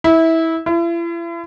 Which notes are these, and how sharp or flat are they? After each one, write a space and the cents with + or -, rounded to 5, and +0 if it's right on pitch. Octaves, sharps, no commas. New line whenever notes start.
E4 -20
E4 +40